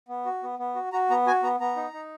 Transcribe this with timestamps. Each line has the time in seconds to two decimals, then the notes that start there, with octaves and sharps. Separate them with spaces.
0.09 B3
0.25 F#4
0.43 B3
0.59 B3
0.75 F#4
0.92 F#4 A#5
1.10 B3 A#5
1.27 F#4 G#5
1.43 B3 A#5
1.60 B3 A#5
1.76 D#4
1.93 D#4